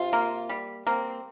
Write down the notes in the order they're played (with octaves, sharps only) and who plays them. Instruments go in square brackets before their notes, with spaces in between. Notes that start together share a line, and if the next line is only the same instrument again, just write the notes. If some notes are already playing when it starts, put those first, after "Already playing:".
Already playing: [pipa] C3 [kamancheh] F4
[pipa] A#3
G3
[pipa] A#3 [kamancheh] C4